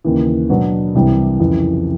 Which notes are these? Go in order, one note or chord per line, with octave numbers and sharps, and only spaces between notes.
D#2 C#3 E3
B2 F#3 B3 D4
C2 C3 E3 G3
F2 C#3 E3